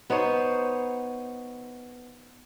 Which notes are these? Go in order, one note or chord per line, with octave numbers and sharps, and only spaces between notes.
B3 D#4 C5 C#5